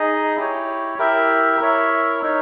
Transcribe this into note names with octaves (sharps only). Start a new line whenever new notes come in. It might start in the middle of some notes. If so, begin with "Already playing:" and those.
Already playing: D#4 G#4 D#5
E4 G4 C#5
E4 G4 A#4 E5
E4 A#4 C#5 E5
D#4 A#4 C#5